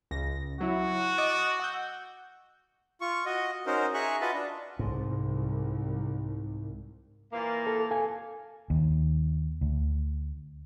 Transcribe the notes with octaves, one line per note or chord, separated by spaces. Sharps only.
C#2 A#6
F#3 E4 F#4
D#5 D6 A6
F#5 E6 G6
F4 C#6
F#4 D#5
C#4 D#4 F#4 A#4 C5
G#4 E5 A#5 C#6 F#6
F4 F#4 B4 D#5 E5 A5
D4
C2 G#2
A#2 E3 A#3
A4
A4 F5 G#5
D#2
D2